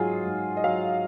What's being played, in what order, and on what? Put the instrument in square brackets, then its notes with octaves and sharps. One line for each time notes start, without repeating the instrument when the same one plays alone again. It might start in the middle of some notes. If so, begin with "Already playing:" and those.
Already playing: [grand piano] G#2 F#3 F4 F#4 G#4
G#2
D#5
F#3 F5